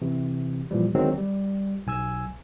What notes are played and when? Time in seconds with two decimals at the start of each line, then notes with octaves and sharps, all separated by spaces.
0.02 C3 E3
0.71 A#2 E3 F3 G3
0.95 D3 D#3 F#3 G#3 B3 C4
1.18 G3
1.87 B1 G#5 E6 G#6